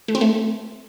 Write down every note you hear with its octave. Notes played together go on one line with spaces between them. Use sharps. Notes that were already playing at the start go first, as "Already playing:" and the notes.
A3
C4
A3